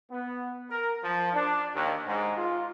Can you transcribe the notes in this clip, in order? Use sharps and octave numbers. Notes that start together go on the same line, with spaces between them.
B3
A#4
F3
D4
D#2
G#2
F4